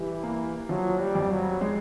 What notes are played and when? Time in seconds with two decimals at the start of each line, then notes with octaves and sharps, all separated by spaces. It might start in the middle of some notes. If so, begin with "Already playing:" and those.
Already playing: E3 G3
0.23 A#3
0.69 F3 F#3
1.00 G3
1.15 F2
1.31 F#3
1.61 G#3